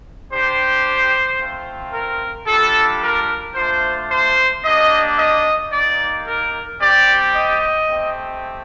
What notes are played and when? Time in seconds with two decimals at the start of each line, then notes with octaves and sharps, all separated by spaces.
0.30 G3 D4 G4 C5
1.38 A3 C4 F4
1.92 A#4
2.47 G3 D4 F4 A4
3.01 A#4
3.55 A3 D4 F4 C5
4.10 C5
4.63 A#3 D4 G4 D#5
5.17 D#5
5.71 A#3 D#4 G4 D5
6.25 A#4
6.79 G3 C4 G4 D5
7.34 D#5
7.88 A3 C4 G4